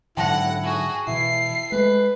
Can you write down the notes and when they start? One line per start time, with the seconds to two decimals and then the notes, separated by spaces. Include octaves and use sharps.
0.17 G#2 D3 F#3 E4 F#5 G5 A5 A#6
0.64 F#4 G#4
1.07 B2 E3 E4 C7
1.72 G#3 A3 B4